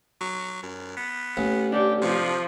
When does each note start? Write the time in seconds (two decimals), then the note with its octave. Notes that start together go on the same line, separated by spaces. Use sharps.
0.21 F#3
0.63 F#2
0.97 B3
1.37 A1
1.72 D4 G4 A4 D5
2.02 C3 F3